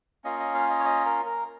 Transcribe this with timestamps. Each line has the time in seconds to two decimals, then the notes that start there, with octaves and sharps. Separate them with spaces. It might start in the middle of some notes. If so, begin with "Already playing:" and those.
0.24 A#3 C#4 F4 D#5
0.40 D#5
0.54 F5
0.70 D#5
0.79 C#5
0.85 D#5
1.05 A#4
1.26 A#4